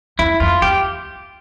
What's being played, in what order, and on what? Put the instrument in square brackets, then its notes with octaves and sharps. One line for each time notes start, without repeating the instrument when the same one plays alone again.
[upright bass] F2 [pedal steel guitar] E4
[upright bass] F2 [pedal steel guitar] F4
[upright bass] F2 [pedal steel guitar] G4